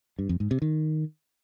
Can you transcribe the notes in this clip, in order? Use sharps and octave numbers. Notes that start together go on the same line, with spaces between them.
G2
F2
G#2
C3
D#3